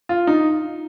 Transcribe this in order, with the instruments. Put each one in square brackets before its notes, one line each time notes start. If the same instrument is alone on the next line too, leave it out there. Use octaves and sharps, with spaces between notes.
[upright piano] F4
D#4